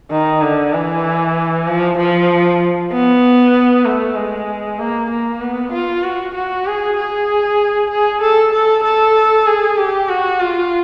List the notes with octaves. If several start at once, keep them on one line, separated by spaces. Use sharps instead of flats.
D#3
D3
E3
F3
F3
B3
A3
G#3
A#3
A#3
B3
F4
F#4
F#4
G#4
G#4
G#4
A4
A4
A4
G#4
G4
F#4
F4